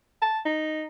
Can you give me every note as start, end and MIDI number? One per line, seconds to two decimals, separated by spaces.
0.22 0.39 81
0.45 0.85 63